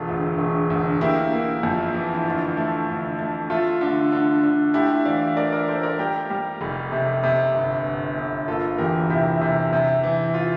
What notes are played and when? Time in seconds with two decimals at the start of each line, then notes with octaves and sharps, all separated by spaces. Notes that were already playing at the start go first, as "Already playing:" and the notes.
Already playing: E1 F4 A4
0.08 D2
0.38 E1
0.70 D2
1.01 A#3 E4 G4
1.32 A#3
1.63 F2
1.94 E3
2.14 E4
2.25 D2 F4
2.57 A3
2.88 D2
3.19 A3
3.50 A3 F4
3.81 D3
4.12 D3
4.43 D3
4.74 A3 E4 G4
5.05 E3 D5 F5
5.36 A3 A#4 D5
5.52 A#4 D5
5.68 A3 A4 C5
5.83 A#4 D5
5.99 G3 G4 A#4
6.30 G3
6.61 F1
6.92 C3
7.23 C3
7.54 G1
7.86 G1
8.17 G1
8.48 A#3 F4 A4
8.78 E2 G4 A#4
9.10 C3 E4 G4
9.41 C3
9.73 C3
10.03 E3
10.34 F4